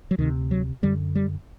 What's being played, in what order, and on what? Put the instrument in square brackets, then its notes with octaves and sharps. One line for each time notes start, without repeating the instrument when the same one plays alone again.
[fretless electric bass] F#3
D2 C3 D#3
F#3
F#2 D3 G3
G3